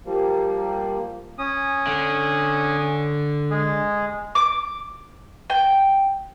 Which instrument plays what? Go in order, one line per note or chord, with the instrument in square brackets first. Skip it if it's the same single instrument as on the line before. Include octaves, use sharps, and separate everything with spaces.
[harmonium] F3 G3 A#3
[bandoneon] C#4 D#6
[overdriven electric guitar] D3
[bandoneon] G#3 G#4
[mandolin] D6
G5